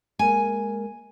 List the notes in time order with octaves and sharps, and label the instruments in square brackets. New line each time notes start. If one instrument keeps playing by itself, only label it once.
[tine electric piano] G#3 A#3 A#4 [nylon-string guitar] G#5